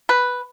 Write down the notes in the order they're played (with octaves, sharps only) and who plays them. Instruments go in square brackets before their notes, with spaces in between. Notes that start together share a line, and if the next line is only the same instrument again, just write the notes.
[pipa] B4